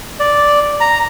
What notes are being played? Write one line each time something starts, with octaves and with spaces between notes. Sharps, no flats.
D5
A#5